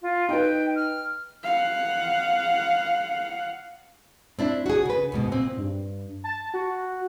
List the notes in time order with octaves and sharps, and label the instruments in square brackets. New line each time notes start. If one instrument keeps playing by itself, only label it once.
[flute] F4
[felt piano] D#4 B4 [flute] G5
[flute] F6
[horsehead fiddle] F5 F#5
[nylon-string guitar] C4 D4 E4
F#4 G#4
C#3 B4
D2 G#2 B2
A#2 C4
[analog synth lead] G2
A5
F#4